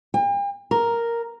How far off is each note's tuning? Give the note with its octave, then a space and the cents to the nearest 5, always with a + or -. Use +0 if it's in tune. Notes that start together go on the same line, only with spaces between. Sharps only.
G5 +45
A#4 +0